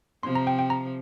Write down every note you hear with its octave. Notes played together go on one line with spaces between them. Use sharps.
C3 F3 C6
A#5
G5
G5
A#5